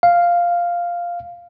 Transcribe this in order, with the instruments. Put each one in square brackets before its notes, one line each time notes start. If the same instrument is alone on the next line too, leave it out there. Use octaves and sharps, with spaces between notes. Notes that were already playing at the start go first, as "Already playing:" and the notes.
[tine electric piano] F5